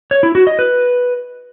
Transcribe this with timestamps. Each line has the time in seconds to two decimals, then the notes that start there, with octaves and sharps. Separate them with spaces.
0.11 C#5
0.23 E4
0.35 F#4
0.47 D#5
0.59 B4